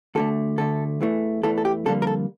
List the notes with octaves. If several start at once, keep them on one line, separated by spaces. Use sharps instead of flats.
D2 D3 A3 A4
D2 D3 A3 A4
E2 E3 A3
E2 E3 A3 A4
A4
G4
F2 D3 G3 A#3 A4
A#4
A4